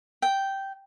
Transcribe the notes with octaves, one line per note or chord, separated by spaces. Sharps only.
G5